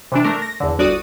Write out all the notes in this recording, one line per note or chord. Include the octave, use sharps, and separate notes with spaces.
C3 E3 D4
A3 D4 A#4
A#6
E2 D3
G1 D2 F#4 D5 D#6 D#7